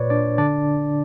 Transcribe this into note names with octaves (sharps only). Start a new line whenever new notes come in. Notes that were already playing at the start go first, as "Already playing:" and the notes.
Already playing: A#2 B4 C#5 D5
D4 D5
D3 D4 D5